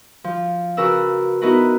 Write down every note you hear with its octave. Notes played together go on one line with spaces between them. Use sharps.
F3
C#3 F#4 A#4 B4 E6
B3 D#4 E4 F#4 A#4 B4